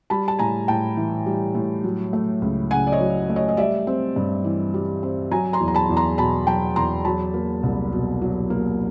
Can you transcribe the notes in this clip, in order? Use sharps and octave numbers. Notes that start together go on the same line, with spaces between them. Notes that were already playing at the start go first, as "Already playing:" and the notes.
G3 A5 B5
A5
A2 G#5 A#5
A2 G5 A5
E3
G3
A2
F#3
A3
C#2
C#3 F#5 G#5
D5
C#5 D#5
F#3
A3
C#5 D#5
D#5
G3 D5 E5
C4
G2
E3
G3
C4
F#3 G#5 A#5
A#5 C6
E2
A#5
A5 B5
E2
A#5 C6
B2 A5 B5
F#3 G5 A5
E2 A#5 C6
F#3 A5 B5
A#3
C2
B2
F#3
A#3